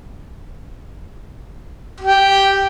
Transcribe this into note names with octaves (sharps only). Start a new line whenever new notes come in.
G4